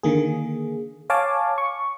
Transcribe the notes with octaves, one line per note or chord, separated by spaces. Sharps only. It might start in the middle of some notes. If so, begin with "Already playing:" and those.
D3 D#3 A#3 G#4
C#5 F5 G#5 A5 D6
C#6